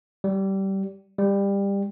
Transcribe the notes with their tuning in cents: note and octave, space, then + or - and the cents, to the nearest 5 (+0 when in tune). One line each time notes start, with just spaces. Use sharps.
G3 -20
G3 +20